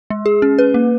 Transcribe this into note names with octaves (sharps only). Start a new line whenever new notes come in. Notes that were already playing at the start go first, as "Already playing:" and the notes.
G#3
G#4
C#4
B4
A#3